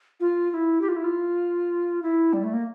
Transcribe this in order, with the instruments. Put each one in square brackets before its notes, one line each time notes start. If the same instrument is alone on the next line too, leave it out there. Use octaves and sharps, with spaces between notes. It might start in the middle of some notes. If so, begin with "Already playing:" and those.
[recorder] F4
F4
E4
G4
F4
E4
F4
E4
G3
A3
A#3